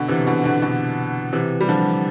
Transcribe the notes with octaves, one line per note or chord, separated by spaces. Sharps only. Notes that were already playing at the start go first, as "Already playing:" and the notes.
Already playing: B2 D3
C3 E3
B2 D3
B2 D3
B2 D3
C3 E3
G3
D3 F3